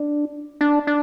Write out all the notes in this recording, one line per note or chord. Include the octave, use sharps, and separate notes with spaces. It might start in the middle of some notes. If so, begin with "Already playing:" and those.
Already playing: D4
D4
D4